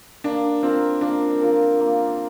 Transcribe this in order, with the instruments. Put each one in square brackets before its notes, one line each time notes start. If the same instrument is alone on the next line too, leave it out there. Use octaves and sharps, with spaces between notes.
[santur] A#3 [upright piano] D4
[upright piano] C4 [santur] F4 A#4
[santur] A#3 [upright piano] D4
[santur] F4 A#4
A#3